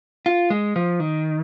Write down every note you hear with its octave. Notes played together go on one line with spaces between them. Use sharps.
F4
G#3
F3
D#3